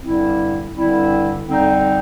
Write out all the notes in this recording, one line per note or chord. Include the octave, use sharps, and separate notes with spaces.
G2 D3 G3 C4 E4
G2 D3 G3 C4 E4
F2 D3 G3 C4 D#4